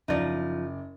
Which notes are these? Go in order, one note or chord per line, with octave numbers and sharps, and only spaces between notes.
F#1 F3 D#4 D5